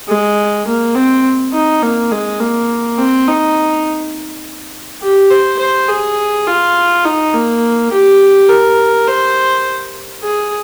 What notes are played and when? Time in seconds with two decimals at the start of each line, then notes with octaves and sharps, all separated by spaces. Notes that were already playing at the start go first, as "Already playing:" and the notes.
0.08 G#3
0.67 A#3
0.95 C4
1.54 D#4
1.83 A#3
2.12 G#3
2.40 A#3
2.98 C4
3.28 D#4
5.02 G4
5.31 C5
5.59 C5
5.89 G#4
6.47 F4
7.05 D#4
7.34 A#3
7.92 G4
8.49 A#4
9.07 C5
10.23 G#4